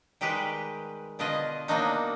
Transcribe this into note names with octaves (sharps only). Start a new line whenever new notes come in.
D#3 G3 G#3 G4 B4
B2 D3 B3 F4 D#5
F#3 A#3 B3 D4 D#4 F#4